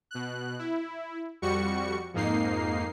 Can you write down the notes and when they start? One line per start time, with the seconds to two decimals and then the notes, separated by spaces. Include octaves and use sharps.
0.11 B2 F#6
0.59 E4
1.42 F2 G3 F#4 C#6 C#7
2.14 F2 G#2 A#3 D#4 C7